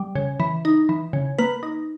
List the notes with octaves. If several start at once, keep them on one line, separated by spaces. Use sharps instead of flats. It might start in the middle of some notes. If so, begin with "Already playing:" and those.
Already playing: G3
C#3
E3
D#4
E3
C#3
A#3 B4
D#4